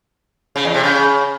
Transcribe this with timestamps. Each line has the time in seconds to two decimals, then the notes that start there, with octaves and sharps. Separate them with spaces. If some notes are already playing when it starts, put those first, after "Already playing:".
0.56 C#3
0.65 E2
0.74 C3
0.84 C#3